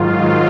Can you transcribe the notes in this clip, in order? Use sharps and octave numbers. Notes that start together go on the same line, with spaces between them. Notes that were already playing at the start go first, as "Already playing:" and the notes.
Already playing: G#2 D#3 F#3 F4